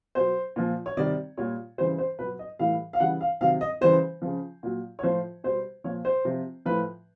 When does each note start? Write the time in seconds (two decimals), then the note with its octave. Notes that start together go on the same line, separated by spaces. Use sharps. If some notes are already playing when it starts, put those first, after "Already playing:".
0.15 B2 F#3 C5
0.56 A#2 F3
0.86 C#5
0.97 C3 D#3 G3 D5
1.37 A#2 G3 C#5
1.78 C#3 E3 G3 C5
1.98 C5
2.19 B2 B4
2.22 F#3
2.39 D#5
2.59 A2 E3 G3 F5
2.93 F5
3.00 C#3 E3 G3 F#5
3.21 F5
3.41 C3 D#3 F#3 F5
3.61 D#5
3.81 C#3 E3 G3 C5
4.22 C#3 F3
4.63 A#2 F#3
4.99 C#5
5.03 A2 F3 C5
5.44 B2 G3 C5
5.84 A#2 F3 C#5
6.05 C5
6.25 C3 F3
6.66 A2 F3 B4